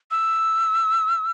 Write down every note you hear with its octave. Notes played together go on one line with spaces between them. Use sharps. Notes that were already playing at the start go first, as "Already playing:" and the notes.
E6